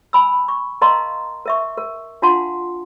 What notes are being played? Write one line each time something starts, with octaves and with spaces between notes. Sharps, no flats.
G#5 B5 E6
C#6
A#4 D#5 F5 A5 A#5 C6
A#4 E5 C#6
A#4
D4 F4 F5 F#5 A5 C6